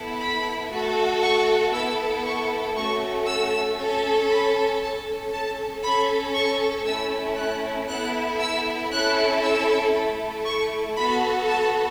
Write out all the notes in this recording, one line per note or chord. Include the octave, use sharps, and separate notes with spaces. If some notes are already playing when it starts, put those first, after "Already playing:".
Already playing: B3 E4 A4
B5
A3 F#4 A4
C#6
B3 E4 A4 E6
C#6
A3 C#4 F#4 A4 C#6
E6
C#4 A4
B5
C#4 A4 A5
A5
C#4 A4 B5
C#6
A3 C#4 E4 E6
F#6
B3 E4 A4 F#6
E6
C#4 E4 A4 F#6
E6
A3 E4 A4
C#6
B3 F#4 A4 B5
A5